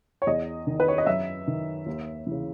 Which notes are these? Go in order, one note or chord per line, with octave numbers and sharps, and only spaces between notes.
C#5
E2 D#5
D#3
B4
C#5
D#5
F#2 E5
D#3
D#2
C#3 E3